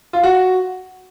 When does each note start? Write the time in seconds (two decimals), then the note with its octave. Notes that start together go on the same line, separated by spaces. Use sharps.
0.13 F4
0.23 F#4